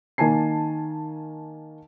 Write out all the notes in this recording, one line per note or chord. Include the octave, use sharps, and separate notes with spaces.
D#3 A#3 G#5 A5 C7